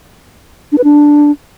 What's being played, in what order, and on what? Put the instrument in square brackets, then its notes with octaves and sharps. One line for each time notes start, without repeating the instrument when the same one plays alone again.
[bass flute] D4
B4
D4